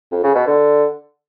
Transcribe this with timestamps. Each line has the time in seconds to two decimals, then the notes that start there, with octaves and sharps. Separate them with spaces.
0.11 F2
0.23 C#3
0.35 B2
0.47 D3